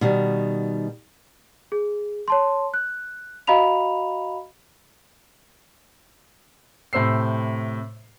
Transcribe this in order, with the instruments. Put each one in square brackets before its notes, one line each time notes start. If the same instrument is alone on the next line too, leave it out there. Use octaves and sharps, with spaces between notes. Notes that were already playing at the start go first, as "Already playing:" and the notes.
[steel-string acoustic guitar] B2 D#3 G3
[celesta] G#4
C#5 A5 C6
F#6
F#4 D#5 F5 A#5 B5 F7
[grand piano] A2 C3 C5 E6 C7